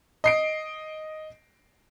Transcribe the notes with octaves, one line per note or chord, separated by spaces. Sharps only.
D#5 C7 D7